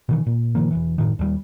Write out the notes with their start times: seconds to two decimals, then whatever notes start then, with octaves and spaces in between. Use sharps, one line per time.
0.09 B2 D#3 E3
0.26 A#2
0.55 A#2 D#3 F3 A#3
0.71 E1 C2 E3
0.98 F#1 B1 A2 D#3
1.19 D#2 D3 G3